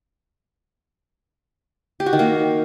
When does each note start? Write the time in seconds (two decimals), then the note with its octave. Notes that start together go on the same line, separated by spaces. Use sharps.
2.00 G4
2.06 F#4
2.13 D#3
2.19 A#3